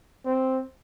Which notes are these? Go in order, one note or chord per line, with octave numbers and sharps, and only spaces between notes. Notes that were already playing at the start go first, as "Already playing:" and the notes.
C4